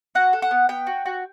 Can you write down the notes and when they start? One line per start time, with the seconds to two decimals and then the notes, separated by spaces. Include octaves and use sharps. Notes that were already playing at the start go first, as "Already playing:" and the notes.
0.15 F#4 F#5
0.33 A4
0.42 F#5
0.51 B3
0.69 B3 G5
0.87 F#4
1.06 F#4